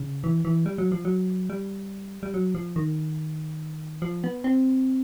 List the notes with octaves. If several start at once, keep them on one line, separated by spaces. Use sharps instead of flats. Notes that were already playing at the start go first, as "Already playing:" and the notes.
Already playing: C#3
E3
E3
G3
F#3
F3
F#3
G3
G3
F#3
F3
D#3
F3
B3
C4